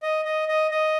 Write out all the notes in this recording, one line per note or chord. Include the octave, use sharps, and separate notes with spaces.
D#5
D#5
D#5
D#5